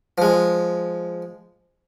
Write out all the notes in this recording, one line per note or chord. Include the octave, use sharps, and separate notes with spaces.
F3 G#3